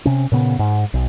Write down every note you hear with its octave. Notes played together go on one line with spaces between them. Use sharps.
C3 C#4
A#2 C#3 B3
G#2
B1